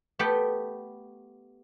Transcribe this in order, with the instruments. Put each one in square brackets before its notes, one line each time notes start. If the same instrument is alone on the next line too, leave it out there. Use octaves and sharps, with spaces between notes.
[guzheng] A3 B3 G4 B4 G5